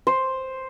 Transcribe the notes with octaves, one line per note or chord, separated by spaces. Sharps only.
C5